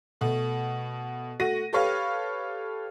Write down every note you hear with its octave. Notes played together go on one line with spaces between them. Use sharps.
B2 A3
A3 F#4 A#6 D#7
G4 A4 B4 C#5 F5